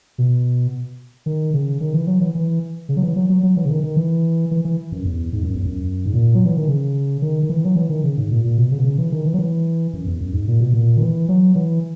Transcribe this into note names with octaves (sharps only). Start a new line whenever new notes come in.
B2
D#3
C#3
D#3
E3
F#3
E3
E3
C#3
F#3
E3
F#3
F#3
F#3
E3
C#3
D#3
D#3
E3
E3
E3
F#2
E2
G#2
F#2
E2
F#2
G#2
A#2
F#3
E3
D#3
C#3
D#3
D#3
E3
F#3
E3
D#3
C#3
G#2
A#2
A#2
B2
C#3
B2
C#3
E3
D#3
E3
F#3
E3
F#2
E2
F#2
G#2
A#2
B2
A#2
D#3
E3
F#3
E3